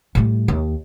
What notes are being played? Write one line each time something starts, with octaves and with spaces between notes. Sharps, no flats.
A2 G3
D#2